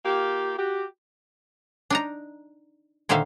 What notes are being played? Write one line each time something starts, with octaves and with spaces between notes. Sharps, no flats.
A#3 F4 G4
F#4 G4
D4 D#4 A#5
A#2 D3 D#3 C5 E5 F5